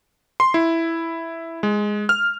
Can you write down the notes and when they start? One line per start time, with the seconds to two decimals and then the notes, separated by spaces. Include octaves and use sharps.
0.40 C6
0.54 E4
1.63 G#3
2.09 F6